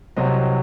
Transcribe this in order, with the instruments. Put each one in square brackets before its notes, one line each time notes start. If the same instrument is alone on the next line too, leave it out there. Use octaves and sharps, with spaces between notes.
[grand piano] C2 C3 F#3 C5 D#5